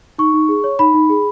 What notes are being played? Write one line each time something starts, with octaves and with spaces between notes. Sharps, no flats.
D#4 C#6
D#4
G#4
C#5
D#4 B5
D#4
G#4